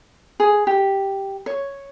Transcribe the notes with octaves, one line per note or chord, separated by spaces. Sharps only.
G#4
G4
C#5